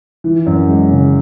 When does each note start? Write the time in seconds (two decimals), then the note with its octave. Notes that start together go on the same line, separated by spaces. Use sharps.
0.24 E3
0.46 F#2
0.68 G#3
0.91 C#3